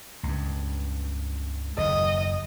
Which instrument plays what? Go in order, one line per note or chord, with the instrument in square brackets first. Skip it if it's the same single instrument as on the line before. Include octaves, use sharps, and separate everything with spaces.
[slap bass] C#2 G2
[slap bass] F#1 D#2 [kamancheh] D#5